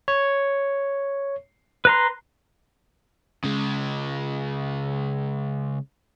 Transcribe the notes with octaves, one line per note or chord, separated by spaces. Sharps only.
C#5
B4 A#5 C6
C#3 G#3